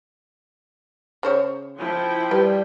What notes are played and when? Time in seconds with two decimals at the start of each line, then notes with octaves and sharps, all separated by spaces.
1.23 C#3 C5 C#5
1.77 F3 E4 G5
2.31 G3 B4